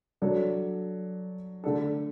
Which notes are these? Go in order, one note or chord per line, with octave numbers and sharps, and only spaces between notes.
F#3 D4 A4 D5
D3 A3 D4 A4